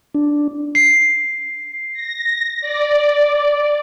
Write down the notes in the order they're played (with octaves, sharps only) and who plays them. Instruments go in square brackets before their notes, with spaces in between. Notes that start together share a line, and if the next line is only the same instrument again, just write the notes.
[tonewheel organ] D4
[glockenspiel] C7
[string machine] A#6
D5